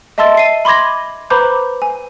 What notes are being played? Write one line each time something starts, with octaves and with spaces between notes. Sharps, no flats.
D#5 E5 A5 C6 E6 A6
C7 D#7
B5 C6 D6 G#6 A#6
B4 C5 A#5 B5 D6 G6
G#5